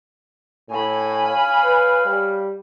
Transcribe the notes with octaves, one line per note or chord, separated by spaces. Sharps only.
A2 G#5 B5
C#5 F5
B4
G3